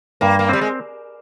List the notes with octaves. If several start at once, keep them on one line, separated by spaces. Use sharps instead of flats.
G2 A#3
A#3
G3 C4
G#3